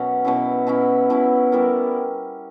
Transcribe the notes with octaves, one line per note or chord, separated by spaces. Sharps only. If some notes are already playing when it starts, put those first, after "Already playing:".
Already playing: B2 F#3 C#4
B2 F#3 C#4 E4
B2 F#3 C#4 E4
B2 F#3 C#4 E4
G3 B3 E4 A#4